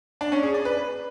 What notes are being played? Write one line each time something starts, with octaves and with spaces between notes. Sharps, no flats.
D4
C#4
G#4
D5
B4